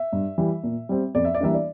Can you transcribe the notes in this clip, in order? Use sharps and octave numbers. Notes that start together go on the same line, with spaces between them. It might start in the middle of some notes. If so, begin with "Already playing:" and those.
Already playing: E5
G2
E3 G3
A#2
G3 C4
F2 D5
E5
D5
E3 G3 A#3 D4 E5
D5